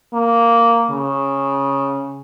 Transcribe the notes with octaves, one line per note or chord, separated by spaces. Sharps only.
A#3
C#3